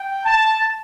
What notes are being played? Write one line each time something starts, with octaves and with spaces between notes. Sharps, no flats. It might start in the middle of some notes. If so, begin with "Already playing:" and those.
Already playing: G5
A5